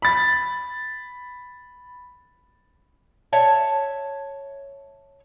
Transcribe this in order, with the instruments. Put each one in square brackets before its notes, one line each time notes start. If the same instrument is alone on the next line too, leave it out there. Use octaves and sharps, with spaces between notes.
[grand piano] B5 A6
[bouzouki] C#5 E5 A5